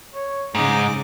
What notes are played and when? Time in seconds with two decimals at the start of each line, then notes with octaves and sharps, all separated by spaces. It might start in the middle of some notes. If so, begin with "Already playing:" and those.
0.14 C#5
0.55 G#2 C#3 D#4 G#4 D6